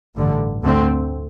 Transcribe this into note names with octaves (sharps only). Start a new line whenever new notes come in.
A1 G2 D3
D2 D3 A3 C4